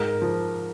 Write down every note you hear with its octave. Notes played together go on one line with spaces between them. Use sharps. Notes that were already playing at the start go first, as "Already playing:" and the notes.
Already playing: G#2 A#4
F3